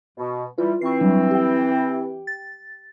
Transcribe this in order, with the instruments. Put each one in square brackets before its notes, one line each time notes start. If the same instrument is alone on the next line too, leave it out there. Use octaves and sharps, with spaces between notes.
[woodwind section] B2
[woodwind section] E3 G3 [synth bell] F4
[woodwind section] E3 C4 [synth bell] C#6 C7
[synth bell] F#3 G3 D4
G4 G5
A6